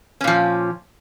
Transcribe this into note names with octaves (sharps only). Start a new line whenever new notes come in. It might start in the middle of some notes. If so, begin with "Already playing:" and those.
A#2 F3 C#4